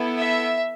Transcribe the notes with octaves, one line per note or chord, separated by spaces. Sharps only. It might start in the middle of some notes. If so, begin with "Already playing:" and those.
Already playing: B3 E4 A4
E5